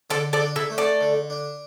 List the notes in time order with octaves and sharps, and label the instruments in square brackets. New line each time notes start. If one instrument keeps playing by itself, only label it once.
[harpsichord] D3 [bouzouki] A4 D5
[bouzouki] A4 D5
[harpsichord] D4
[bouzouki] E4 A4
[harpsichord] A3
[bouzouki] A4 D5
[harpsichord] D3
D4